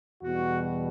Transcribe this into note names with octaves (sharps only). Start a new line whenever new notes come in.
E2 B2 G3 F#4